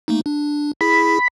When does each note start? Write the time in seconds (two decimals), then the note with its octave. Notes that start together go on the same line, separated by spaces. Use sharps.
0.08 A3 A#3 D#4
0.26 D4
0.81 E4 G#4 B5